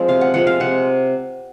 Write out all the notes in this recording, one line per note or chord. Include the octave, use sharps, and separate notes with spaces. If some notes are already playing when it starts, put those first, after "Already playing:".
Already playing: F3 G#3 C4
C3 F5
F#5
F3 G#3 C4 F#5
F5
C3 F#5